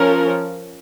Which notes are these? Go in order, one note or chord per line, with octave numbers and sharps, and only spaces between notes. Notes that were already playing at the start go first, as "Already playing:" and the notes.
Already playing: F3 C#4 A#4